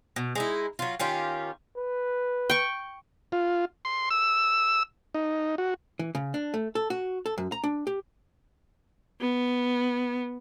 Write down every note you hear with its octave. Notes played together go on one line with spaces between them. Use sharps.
B2
G#3 D#4 E4
F#3 F4
D#3 C#4 F4 G4
B4
G5 C#6
F4
C6
E6
D#4
F#4
E3
C#3
D4
A3
A4
F#4
A4
F#2
A#5
D4
G4
B3